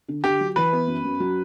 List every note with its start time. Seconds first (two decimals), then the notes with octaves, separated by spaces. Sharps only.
0.08 D3
0.24 D3 G4
0.40 F#3
0.56 E3 B4
0.73 B3
0.88 F#2
1.04 F#2
1.20 F#3